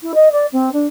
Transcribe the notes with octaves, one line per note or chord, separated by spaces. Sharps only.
E4
D#5
D5
C4
D4